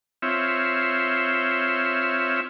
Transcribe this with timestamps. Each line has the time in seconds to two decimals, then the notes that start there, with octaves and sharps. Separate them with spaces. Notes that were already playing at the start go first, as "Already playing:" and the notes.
0.22 C4 F4 C#5 E5